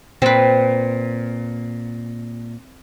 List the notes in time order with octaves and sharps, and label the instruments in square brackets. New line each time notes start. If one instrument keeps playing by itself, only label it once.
[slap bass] A#2 [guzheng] C4 B4